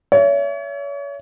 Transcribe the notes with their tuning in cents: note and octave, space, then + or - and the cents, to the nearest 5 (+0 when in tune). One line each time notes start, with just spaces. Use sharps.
C#5 +35 E5 +20